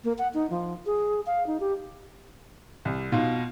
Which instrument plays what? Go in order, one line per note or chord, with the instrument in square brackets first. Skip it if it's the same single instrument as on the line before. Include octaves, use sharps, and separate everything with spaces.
[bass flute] A#3
F#5
D#4
F3
G#4
F5
D#4
G4
[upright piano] C2
B2 D#4 F4